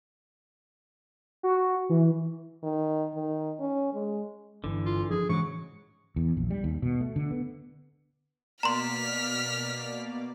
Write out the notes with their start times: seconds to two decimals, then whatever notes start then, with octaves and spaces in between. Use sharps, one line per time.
1.43 F#4
1.89 E3
2.64 D#3
3.15 D#3
3.60 C#4
3.94 G#3
4.64 G1 D3 E3
4.86 F4
5.10 F3 D4 G#4
5.29 G#2 C#3 E3 F#3 C#6
6.16 E2
6.37 A#1
6.51 G3
6.64 D#2
6.82 B2
7.01 A3
7.16 D3
7.31 B3
8.63 B2 A#3 D5 A#5 C6 F6 B6